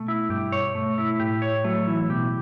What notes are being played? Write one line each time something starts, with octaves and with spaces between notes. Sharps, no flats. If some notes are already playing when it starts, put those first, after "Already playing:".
Already playing: B2 A3
E4
G2 G4
C#5
A3
E4
A2 G4
C#5
F#3 A3
E3 E4
B2 G4